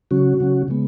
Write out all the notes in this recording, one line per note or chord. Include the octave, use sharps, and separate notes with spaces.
C#3 F#3 C#4 F#4
C#3 F#3 C#4
C#3 G#3 B3